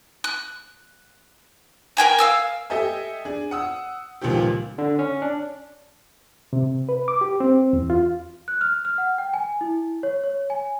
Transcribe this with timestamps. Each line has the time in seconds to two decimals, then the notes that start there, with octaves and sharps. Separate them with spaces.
0.24 F#6
1.97 A#4 G5 G#5 A#5
2.19 F5 E6 F6
2.70 G4 A4 D#5 E5 G#5
3.25 D4 G#4
3.51 F#5 D#6 E6
4.21 C#2 A#2 D#3 F3 G4
4.78 D3
4.99 C#4
5.22 D4
6.53 C3
6.89 B4
7.08 D6
7.21 G4
7.40 C4
7.73 E2
7.90 F4
8.48 F#6
8.61 F6
8.85 F6
8.98 F#5
9.18 G5
9.34 G#5
9.61 E4
10.03 C#5
10.24 C#5
10.50 G#5